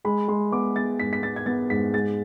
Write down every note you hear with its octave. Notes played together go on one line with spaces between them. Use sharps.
G#3 B5
G#3 C6
B3 D6
B3 A6
G#2 B6
B6
B3 A6
G#6
B3 A6
G#2 B6
G#3 A6